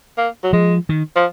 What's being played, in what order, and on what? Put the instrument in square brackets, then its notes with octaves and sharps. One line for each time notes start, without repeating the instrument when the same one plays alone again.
[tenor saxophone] A#3
F#3
[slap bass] F3 [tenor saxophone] G#3
[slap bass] D#3
[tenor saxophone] F3